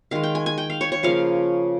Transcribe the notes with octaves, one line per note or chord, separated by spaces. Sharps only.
D#3 G#3 F5
G5
G#5
G#5
G5
F5
C#5
C#5
C#3 F3 A#3 F5